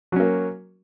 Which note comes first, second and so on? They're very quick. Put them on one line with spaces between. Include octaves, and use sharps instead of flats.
F#3 C#4 A#3